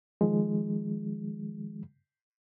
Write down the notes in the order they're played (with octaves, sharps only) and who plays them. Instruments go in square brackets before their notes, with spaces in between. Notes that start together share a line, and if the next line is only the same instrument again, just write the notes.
[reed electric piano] D#3 F3 G#3